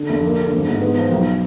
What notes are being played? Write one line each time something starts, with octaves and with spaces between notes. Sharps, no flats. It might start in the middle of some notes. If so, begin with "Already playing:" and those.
Already playing: D3
F1
A#3
D3
G#1
G#2
B3
F3
B1